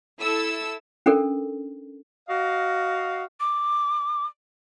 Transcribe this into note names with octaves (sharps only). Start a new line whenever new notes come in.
E4 A4 E6
C#4 D4 A4 A#4
F#4 D#5 F5
D6